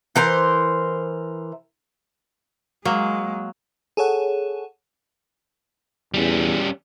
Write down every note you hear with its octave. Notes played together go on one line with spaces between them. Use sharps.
E3 A#4 C5
F#3 G#3 A#3
G#4 A4 C#5 F#5
E2 G3 C#4